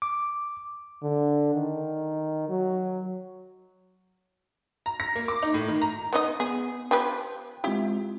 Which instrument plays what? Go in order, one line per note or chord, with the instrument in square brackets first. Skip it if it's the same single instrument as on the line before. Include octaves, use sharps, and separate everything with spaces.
[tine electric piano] D6
[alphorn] D3
D#3
F#3
[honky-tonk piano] A#5
A#6
A#3
D6
D#4
A2
D#3
A#5
[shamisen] B3 D#4 D#5
[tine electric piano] B3 [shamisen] G#4
[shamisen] F3 G4 B4 [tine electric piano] G5
[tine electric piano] G#3 C4 F4 [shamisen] E4 G4